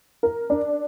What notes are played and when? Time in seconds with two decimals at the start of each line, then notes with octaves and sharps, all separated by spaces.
0.23 A#4
0.50 D4